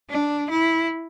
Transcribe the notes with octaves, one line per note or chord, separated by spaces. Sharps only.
D4
E4